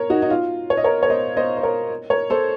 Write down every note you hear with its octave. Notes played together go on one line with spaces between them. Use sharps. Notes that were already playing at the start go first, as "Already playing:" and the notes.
Already playing: A#4 C#5
D#4 F#4
D#4
F4
C#5
D#5
A#4 C#5
C#5
C5 D#5
C5 D#5
C5
A#4 C#5
A#4 C#5
A4 C5